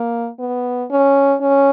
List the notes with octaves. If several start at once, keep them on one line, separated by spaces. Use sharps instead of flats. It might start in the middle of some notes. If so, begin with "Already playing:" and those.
Already playing: A#3
B3
C#4
C#4